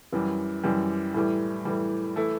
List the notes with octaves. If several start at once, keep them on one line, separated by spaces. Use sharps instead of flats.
F#2 E3 G3
F#2 E3 G3
A2 E3 G3
A2 E3 G3
E3 A3 E4 A4